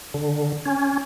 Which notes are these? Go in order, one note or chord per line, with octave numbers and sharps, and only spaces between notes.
D3
C#4